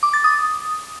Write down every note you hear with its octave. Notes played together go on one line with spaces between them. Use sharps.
D6
A6
D#6